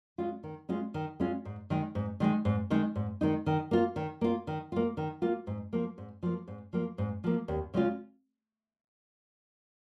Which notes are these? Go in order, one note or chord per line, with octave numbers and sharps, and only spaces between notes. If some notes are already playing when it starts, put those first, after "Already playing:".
G#3 C#4 F4
D#3
G#3 C#4 F4
D#3
G#3 C#4 F4
G#2
D#3 G#3 D#4
G#2
D#3 G#3 D#4
G#2
D#3 G#3 D#4
G#2
D#3 G#3 D#4
D#3
A#3 F4
D#3
A#3 F4
D#3
A#3 F4
D#3
A#3 F4
G#2
F3 A#3
G#2
F3 A#3
G#2
F3 A#3
G#2
F3 A#3
D#2
C#3 G#3 C#4 F4